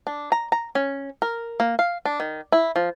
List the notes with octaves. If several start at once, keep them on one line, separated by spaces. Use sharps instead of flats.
D4
A#5
A#5
C#4
A#4
A#3
F5
D4
D#3
E4
F3